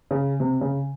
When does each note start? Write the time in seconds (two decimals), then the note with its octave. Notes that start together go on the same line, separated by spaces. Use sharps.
0.11 C#3
0.40 C3
0.61 C#3